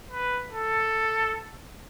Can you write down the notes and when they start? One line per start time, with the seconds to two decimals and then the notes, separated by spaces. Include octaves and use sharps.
0.11 B4
0.52 A4